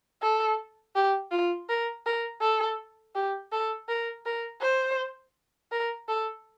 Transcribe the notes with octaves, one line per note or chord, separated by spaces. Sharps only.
A4
G4
F4
A#4
A#4
A4
G4
A4
A#4
A#4
C5
A#4
A4